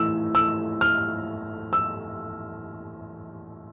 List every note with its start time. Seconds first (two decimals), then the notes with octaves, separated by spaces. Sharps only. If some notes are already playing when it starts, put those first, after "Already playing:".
Already playing: A2 E3 E6
0.35 E6
0.81 F6
1.73 E6